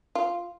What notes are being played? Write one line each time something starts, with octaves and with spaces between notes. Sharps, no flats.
F4